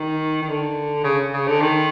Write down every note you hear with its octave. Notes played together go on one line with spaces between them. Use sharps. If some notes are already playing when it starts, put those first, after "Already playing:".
Already playing: D#3
D#3
D3
C#3
C#3
D3
D#3